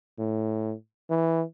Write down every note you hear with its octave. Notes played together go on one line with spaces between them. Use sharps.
A2
E3